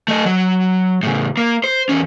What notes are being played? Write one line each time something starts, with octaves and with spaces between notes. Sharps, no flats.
A3 D#5
F#3
A2 C#3
A#3
C5
E2 C#4